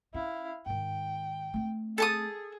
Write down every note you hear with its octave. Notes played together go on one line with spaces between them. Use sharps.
C#4 E4 F5
G#2 D#3 G5
A3 C4
G#4 A4 A5 D#6